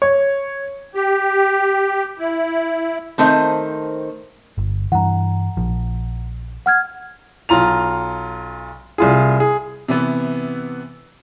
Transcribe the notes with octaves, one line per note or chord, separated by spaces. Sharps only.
C#5
G4
E4
D#3 A3 C4 C5 D#5
G1
G2 E3 F#5 A#5
A#1 F3
F#5 F6 G#6
B1 F4 A#5 F7
C2 F4 G#4
G#4
C3 E3 B3